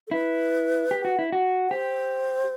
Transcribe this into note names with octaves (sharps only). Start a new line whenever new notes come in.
A4
E4 B4
G4
F#4
E4
F#4
G4 C5